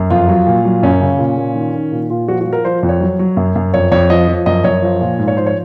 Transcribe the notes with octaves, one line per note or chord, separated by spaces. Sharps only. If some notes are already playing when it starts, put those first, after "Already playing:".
Already playing: F#2
F2 F4
F#3
A#2
F#3
F#2 C#4
C#3
A#2
A#2
D#3
D#3
A#2
A#2 F4
F3 F#4
F#4
F3
A#4
F3 C5
F2
C#5
F#3
F#3
F#2
F#2
F2 C#5
F2 C#5
F3 D#5
F3
F#2 D#5
F#2 C#5
F3
A#2
G#2
C#5
F3 C5
C#5